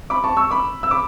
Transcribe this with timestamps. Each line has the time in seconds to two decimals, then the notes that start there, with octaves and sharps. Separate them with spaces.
0.10 B5 D6
0.24 A5 C#6
0.37 C#6 E6
0.51 B5 D6
0.83 E6
0.91 B5 D6